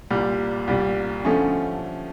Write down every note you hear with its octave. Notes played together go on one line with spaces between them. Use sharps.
C2 A#2 G3
C2 A#2 G3
D3 F3 A3 C#4